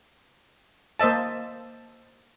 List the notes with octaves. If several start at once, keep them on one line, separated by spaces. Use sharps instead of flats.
A#3 C5 D#5 E5 A5